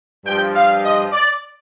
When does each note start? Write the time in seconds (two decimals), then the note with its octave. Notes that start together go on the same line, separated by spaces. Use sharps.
0.25 G2 F3 G5
0.54 F5
0.83 D#5
1.12 D5